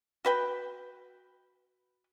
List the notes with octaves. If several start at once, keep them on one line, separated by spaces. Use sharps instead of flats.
F#4 B4 G5